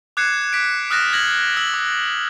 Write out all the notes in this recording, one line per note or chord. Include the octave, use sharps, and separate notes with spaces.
D6 F#6 G#6 C7 C#7 E7
D6 B6 D7
D#6 F6 F#6 A6 A#6 E7
F6 G#6 A#6 F#7
E6 F#7
D6